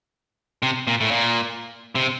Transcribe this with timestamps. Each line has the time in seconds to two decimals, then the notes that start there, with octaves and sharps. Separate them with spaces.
0.63 C3
0.87 A#2
1.01 A2
1.11 A#2
1.95 C3